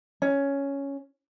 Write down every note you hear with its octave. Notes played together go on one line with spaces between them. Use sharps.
C#4